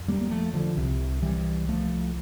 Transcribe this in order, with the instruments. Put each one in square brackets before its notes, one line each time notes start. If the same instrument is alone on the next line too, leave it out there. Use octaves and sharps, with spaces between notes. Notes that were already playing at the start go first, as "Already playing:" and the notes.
Already playing: [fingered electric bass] F2
G3 A#3
A#3
F3 A3
D3 F3
C2 C3
E3 G3
F3 A3